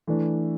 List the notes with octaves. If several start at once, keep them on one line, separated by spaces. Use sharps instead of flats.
E3 A3 D4